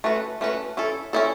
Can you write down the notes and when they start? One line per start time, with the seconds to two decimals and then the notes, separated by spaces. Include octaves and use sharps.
0.04 A3 C#4 F#4 B4
0.41 A3 C#4 F#4 B4
0.77 C#4 E4 A4
1.13 C#4 E4 A4